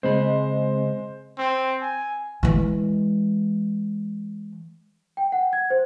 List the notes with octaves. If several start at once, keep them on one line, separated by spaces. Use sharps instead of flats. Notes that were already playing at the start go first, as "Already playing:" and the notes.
C#3 G#3 C4 C5 B5
C4
G#5
E3 G#3
G5
F#5
G#6
C5